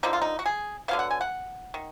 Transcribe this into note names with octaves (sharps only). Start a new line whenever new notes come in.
D3 F3 A#3 D#4
F4
D#4
F#4
G#4
D3 F#3 B3 F5
F#5
G#5
F#5
D#3